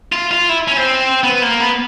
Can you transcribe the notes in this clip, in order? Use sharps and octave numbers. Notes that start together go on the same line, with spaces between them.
F4
F4
E4
C#4
C4
B3
A#3
B3